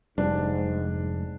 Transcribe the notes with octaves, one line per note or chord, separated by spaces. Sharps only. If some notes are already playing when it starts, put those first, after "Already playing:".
F1 G#2 G3 D4